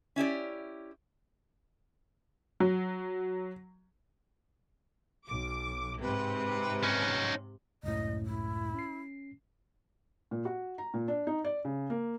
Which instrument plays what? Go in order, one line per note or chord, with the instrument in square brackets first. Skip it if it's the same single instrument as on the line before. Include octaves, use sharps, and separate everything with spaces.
[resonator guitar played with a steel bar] C#4 E4 G4 D5
[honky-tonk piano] F#3
[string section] B1 D6
[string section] G#2 C3 [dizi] B4
[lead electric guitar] C#4 D#4
[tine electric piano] C#2 F#2 A2 [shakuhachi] D#5
[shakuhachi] E4
[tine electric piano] C#4 C7
[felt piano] A#2
F#4
A#5
A#2
D4
D#4
D5
C#3
A#3